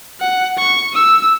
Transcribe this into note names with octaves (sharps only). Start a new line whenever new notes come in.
F#5
C#6
E6